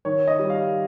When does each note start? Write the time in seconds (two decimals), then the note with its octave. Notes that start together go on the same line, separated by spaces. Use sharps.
0.05 D#3 C#5
0.28 D#5
0.39 G3
0.50 F5